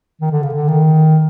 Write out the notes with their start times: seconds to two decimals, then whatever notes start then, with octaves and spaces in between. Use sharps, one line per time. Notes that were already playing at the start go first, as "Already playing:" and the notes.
0.21 D#3
0.31 D3
0.43 C#3
0.54 D3
0.69 D#3